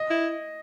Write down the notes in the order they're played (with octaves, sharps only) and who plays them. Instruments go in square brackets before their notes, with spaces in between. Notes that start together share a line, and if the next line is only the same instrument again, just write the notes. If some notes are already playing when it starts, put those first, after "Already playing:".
Already playing: [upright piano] D#5
[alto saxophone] E4